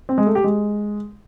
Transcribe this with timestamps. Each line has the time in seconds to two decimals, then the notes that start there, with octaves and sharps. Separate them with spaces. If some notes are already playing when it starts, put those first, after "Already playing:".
0.09 C4
0.18 G#3
0.26 A3
0.35 G4
0.44 G#3